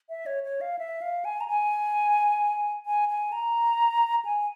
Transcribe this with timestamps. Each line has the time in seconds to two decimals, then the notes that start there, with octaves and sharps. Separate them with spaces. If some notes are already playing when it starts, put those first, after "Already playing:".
0.09 E5
0.26 C#5
0.44 C#5
0.61 F5
0.79 E5
1.02 F5
1.25 G#5
1.41 A#5
1.48 G#5
2.86 G#5
3.09 G#5
3.32 A#5
4.25 G#5